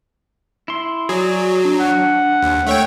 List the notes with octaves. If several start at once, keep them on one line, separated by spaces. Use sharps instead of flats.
E4 C6
F#3 G#4 D5
D4
F#5
D#2
A3 C#5 G5